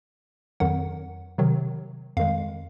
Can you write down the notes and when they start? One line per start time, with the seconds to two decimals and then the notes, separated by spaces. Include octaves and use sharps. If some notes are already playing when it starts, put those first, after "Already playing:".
0.60 F2 D#3 F#3 F#5
1.38 C3 D#3 F#3
2.17 F2 D#3 G#3 F5